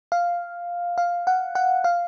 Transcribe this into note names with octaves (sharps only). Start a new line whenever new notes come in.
F5
F5
F#5
F#5
F5